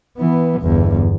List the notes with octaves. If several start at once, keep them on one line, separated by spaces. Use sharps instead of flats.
E3 B3
G1 E2